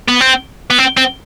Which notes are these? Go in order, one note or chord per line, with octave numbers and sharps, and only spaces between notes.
B3
C4
B3
C4
C4